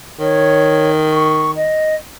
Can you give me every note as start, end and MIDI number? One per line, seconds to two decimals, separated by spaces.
0.20 1.76 51
0.20 0.90 73
1.11 1.51 85
1.56 1.95 75